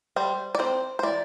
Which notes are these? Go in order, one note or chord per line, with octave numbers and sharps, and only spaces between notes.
G3 C5
D5
C4 C5
C5
E3 D5